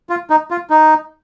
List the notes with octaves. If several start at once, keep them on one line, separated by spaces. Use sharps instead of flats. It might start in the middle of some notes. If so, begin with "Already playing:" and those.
F4
D#4
F4
D#4